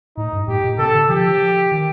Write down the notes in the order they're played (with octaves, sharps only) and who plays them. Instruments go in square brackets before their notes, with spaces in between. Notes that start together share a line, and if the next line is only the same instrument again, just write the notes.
[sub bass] A2 [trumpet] D#4
[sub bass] G2
[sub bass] A2 [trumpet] G4
[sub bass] A#2
[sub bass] C3 [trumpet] A4
[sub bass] D3
[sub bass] F3 [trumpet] G4
[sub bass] D#3